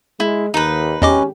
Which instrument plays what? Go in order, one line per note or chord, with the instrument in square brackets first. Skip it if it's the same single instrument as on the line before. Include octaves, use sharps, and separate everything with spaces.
[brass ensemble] G#3 [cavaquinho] E4
[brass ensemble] D#2 [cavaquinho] D#4 B4
[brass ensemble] G#1 G4 [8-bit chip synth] E2 D#5 D6 [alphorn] C#4